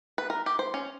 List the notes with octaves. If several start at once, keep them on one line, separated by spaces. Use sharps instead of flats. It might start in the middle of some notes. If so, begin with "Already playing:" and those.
B4
A#4
G4
C5
C#4